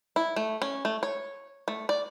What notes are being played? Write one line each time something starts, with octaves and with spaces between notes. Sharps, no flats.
E4
A3
C#4
A3
C#5
A3
D5